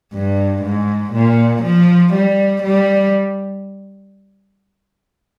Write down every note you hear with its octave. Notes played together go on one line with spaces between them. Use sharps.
G2
G#2
A#2
F3
G3
G3